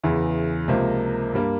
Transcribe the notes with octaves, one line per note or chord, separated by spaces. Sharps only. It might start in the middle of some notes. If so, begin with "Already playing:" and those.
E2 C#3 E3
C#2 C3 F3 A#3
G2 G3 A#3